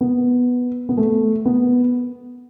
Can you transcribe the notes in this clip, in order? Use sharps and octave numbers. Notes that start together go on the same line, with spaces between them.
B3
B3
A3
B3